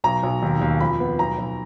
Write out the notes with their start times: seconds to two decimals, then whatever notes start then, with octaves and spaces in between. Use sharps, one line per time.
0.04 B1 A#5
0.23 B1
0.42 D#2
0.61 D#2
0.80 F2 B5
1.00 B3
1.19 B1 A#5
1.38 B1